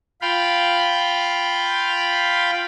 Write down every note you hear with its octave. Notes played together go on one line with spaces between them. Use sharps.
F4 F5 G5 B5